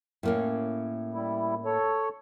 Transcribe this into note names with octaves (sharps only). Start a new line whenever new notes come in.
A2 A#3 C#4
G3 E4
A4 C#5